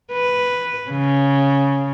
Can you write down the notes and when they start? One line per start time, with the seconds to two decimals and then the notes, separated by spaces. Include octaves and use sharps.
0.12 B4
0.90 C#3